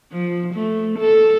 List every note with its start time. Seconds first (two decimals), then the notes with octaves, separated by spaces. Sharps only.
0.12 F3
0.54 A3
0.99 A4